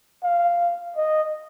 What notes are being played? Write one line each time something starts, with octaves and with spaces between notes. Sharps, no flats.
F5
D#5